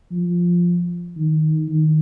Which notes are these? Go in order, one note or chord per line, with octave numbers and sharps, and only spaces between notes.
F3
D#3
D#3